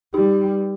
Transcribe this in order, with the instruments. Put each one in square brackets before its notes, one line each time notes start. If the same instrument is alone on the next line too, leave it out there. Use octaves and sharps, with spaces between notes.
[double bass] G3 [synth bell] D#4 G4